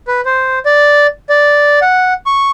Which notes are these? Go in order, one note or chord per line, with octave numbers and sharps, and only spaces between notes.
B4
C5
D5
D5
F#5
C#6